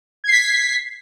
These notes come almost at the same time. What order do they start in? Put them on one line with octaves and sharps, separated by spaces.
G#6 C7 B6